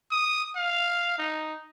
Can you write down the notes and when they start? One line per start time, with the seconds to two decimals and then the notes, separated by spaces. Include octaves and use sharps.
0.11 D#6
0.56 F5
1.18 D#4